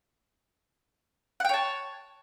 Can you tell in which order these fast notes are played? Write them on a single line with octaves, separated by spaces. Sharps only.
F#5 G5 C#5 A5